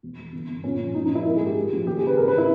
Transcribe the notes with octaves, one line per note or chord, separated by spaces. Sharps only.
E1
E1
G1
G1
A#2 C#4
A#1
A#1 D#4
D#4
A#1 E4
G#1 A#4
G#2 G#4
G4
A#2
A#1
D#2 G4
G#4
C#3 B4
G#1 A#4
B4
E4